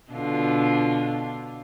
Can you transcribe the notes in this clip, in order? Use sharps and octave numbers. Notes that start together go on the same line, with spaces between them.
B2 D3 F4